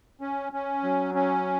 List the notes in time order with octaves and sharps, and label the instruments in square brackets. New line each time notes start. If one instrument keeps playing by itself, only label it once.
[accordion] C#4
C#4
F#3
C#4